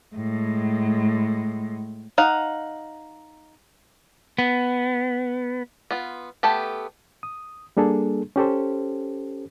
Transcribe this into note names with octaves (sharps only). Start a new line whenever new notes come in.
A2 G#3
D#4 F5 F#5
B3
B3 F4
A3 B3 G4 A4
D#6
G3 A#3 D4 G#4 A4
C#4 G4 A4 C5